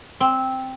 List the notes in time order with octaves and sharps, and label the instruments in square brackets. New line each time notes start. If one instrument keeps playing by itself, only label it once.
[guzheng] C4